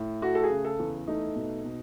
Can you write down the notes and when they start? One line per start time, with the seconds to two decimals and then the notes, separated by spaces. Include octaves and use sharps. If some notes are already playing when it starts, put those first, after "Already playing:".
Already playing: A2
0.22 A3 F#4
0.35 A4
0.43 G#4
0.50 C#3
0.65 A4
0.79 E2
1.07 A3 D#4
1.35 B2
1.65 B2